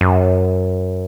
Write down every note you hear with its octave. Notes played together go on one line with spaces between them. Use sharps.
F#2